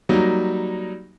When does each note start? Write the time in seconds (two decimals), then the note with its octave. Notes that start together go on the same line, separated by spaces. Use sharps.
0.09 F#3 G3 A#3 D#4